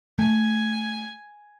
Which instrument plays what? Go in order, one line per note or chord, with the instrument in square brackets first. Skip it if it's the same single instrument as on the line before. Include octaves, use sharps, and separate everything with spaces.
[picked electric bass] A3 [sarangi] G#5